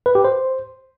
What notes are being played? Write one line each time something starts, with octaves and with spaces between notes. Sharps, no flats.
B4
G4
C5